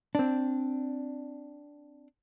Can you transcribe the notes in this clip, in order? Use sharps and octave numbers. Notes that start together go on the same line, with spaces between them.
C4 D4